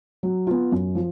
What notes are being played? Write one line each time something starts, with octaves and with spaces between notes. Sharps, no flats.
F#3
B3 F4
F#2
F3